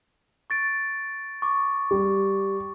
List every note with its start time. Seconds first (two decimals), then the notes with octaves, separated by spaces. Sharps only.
0.50 C#6 A6 D7
1.42 C#6 D6
1.91 G3